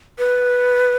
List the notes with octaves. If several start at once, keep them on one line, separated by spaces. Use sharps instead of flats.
B4